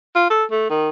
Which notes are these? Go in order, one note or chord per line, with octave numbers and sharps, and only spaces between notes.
F4
A4
A3
D#3